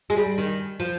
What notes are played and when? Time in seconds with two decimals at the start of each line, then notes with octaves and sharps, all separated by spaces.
0.10 G#3
0.17 G3
0.38 D#3
0.80 F3